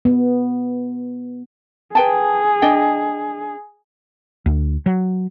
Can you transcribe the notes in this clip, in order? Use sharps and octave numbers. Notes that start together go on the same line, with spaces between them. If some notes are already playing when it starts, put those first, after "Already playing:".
B3
G#4 B4 G5 A5
D4 D#5 G5
D2
F#3